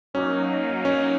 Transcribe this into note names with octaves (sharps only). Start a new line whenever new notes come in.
F#3 A#3 C#4 D#4
C#4